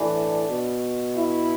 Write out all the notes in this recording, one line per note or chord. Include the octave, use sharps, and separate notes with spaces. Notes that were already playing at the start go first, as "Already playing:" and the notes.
Already playing: A2 E3 D4
B2
E4